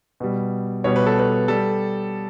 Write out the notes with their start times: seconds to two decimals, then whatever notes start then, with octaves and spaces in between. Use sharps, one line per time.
0.20 B2 G3
0.84 B2 G3 C#5
0.96 B4
1.06 A4
1.19 B4
1.48 G3 A4